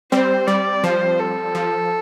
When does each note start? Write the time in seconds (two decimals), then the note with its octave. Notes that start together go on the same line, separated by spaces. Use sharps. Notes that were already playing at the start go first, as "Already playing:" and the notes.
0.12 G3 C4 C5
0.47 G3 D5
0.84 F3 C5
1.20 A4
1.55 F3